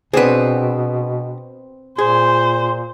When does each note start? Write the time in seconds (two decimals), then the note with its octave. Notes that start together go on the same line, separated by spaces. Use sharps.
0.14 B2 B3 C4 D4 G#4 B4
1.98 A#2 G#4 C5